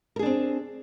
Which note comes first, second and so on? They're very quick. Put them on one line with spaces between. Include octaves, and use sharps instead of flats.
A#4 G#4 D4 C4